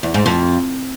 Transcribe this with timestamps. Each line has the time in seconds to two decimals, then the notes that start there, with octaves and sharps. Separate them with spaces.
0.03 E2
0.14 G#2
0.26 F2